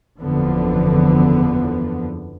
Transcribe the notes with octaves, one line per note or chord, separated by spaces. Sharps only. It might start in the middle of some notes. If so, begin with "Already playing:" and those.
F#1 E2 D3 F3 B3